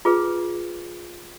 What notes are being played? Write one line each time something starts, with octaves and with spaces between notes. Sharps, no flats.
F4 G#4 B4